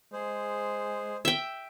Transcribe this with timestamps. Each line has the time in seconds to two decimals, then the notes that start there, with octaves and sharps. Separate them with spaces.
0.13 G#3 G#4 C5
1.25 E5 G5